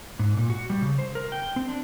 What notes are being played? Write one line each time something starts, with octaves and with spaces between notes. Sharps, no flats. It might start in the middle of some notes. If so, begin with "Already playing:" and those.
G#2
A#2
F#4
G3
C#3
C5
A#4
G5
C4
D4